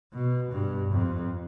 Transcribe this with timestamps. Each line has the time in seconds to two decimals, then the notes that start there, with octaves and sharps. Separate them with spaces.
0.13 B2
0.52 G2
0.92 F2